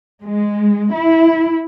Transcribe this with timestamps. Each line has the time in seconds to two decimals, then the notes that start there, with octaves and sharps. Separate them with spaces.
0.22 G#3
0.94 E4